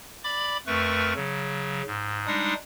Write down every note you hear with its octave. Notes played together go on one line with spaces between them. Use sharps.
D5 B5 D6
F2 A3 A#4 B4 C#6
C#3 F#3
G#2
G3 G#3 D4 D#4 D#6